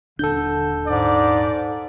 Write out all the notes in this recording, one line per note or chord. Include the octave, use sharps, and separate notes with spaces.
D#1 D3 D4 A4 G6
G#2 D5